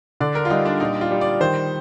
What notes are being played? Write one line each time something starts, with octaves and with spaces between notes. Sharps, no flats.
D3 D5
A#4
F4
G3 D#4
D4
A#2 D#4
F4
G3
D5
D#3 C5